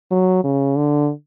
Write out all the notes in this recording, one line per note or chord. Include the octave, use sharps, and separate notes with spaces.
F#3
C#3
D3